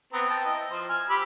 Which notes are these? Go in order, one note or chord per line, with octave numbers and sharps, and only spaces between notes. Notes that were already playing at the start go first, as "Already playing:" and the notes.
B3 C4 A#5
G5 A5
E4 D#5
F3 C5
G#5 F6
G4 B5 E6